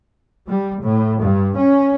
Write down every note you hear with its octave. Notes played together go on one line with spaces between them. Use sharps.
G3
A2
G2
C#4